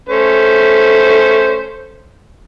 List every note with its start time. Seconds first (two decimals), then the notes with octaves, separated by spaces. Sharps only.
0.09 A3 C#4 C5